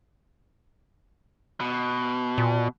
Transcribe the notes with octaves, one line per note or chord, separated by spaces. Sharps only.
B2
A#2